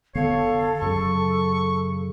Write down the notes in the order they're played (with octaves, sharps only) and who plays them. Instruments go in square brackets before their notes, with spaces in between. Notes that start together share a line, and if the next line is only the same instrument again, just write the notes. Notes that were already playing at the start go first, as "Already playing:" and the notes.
[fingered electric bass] F1 D3 B3 [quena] A4 [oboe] C#5 [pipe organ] F5
[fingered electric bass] F#2 F#3 [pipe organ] C#3 [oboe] C#6